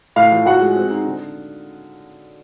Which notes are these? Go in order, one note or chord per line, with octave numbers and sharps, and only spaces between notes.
A2 F5
F3
A2 F#4 F#5
G#3
C4
D#4
D3